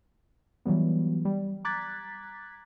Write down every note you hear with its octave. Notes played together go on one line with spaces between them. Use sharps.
E3 F#3 G3 B3
G3
A#5 D6 F#6 G#6 A6 B6